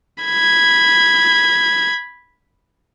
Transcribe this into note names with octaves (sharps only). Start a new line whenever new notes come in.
B5 G#6